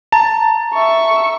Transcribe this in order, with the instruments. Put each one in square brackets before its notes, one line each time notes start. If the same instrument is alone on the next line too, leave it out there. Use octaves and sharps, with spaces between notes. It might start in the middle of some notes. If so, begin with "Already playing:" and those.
[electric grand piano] A5 [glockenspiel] A#5
[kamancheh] E5 C#6